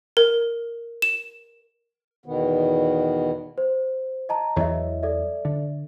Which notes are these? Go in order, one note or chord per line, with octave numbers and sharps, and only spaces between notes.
A#4
E7
E2 B2 D#3 B3
C5
D#5 A5 A#5
E2 E3 F#3 C#5 D#5 E5
A4 D5 E5
D3